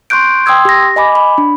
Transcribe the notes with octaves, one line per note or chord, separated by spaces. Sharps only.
C6 C#6 F#6 G6 D7
G5 C6 D#6 E6 G#6
G4 A#6
D#5 G#5 B5 D6
B5
D4